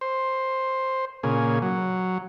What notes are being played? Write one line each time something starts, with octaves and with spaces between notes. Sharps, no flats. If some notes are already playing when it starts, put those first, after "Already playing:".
C5
A#2 C#3 G#4
F#3